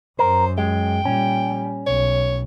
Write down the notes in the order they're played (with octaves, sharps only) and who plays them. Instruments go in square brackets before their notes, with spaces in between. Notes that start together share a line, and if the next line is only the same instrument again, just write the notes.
[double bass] F#2 [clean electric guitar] A#4 [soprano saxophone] C5
[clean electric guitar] G#3 [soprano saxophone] G5
[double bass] A#2 G3 [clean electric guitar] C#4
[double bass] B1 [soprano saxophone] C#5